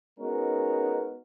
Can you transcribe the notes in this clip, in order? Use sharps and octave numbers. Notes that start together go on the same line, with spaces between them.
G#3 B3 C#4 D#4 F#4 A#4